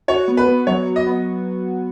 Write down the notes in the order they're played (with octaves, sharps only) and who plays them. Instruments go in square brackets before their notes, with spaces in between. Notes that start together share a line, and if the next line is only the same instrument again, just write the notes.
[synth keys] F#4 [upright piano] C#5
[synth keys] B3
[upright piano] B4
[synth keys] B3
[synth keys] F#3 [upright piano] C#5
[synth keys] F#3
[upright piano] D#5
[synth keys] B3